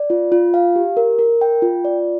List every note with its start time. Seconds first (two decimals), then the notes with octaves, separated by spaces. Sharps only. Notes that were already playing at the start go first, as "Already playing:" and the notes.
Already playing: D5
0.10 F4
0.32 F4
0.54 F5
0.76 G4
0.97 A#4
1.19 A#4
1.41 G5
1.62 F4
1.85 D5